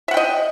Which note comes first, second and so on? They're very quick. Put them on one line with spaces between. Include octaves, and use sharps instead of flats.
E5 F#5 G5 D#5